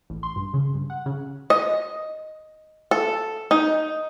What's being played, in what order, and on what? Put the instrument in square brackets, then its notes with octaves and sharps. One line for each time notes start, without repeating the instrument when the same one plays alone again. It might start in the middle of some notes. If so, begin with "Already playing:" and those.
[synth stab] A1
C6
G2
C#3
G2
F#5
C#3
[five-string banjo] D#5
A4
D#4